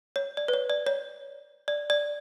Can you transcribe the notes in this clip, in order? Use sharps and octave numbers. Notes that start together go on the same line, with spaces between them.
C#5
D5
B4
C#5
D5
C#5
D5
D5